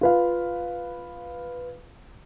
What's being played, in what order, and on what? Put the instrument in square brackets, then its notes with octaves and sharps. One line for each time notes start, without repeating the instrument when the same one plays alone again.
[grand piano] F4 B4 F5